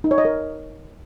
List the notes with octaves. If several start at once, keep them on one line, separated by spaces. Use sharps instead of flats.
D#4
C#5
D#5
A#4